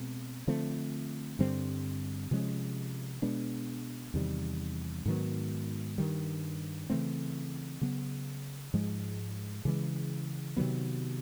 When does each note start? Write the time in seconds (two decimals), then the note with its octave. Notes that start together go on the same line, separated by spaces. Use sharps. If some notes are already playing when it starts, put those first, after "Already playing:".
Already playing: B2 G#3 C4
0.47 D3 F3 A3 C4
1.39 G2 D3 G3 C4
2.31 C3 F3 G#3 C#4
3.22 B2 G#3 B3 D4
4.14 E2 C3 D#3 G3
5.06 G#2 D#3 F#3 B3
5.98 G2 D#3 G3
6.90 C#3 E3 A3 C4
7.81 C#3 F#3 B3
8.74 G#2 F3 G#3
9.65 C#3 E3 G#3
10.57 C3 D#3 F#3 B3